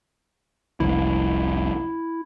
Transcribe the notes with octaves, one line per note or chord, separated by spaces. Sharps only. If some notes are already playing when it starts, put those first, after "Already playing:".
F1 C2 E3 E4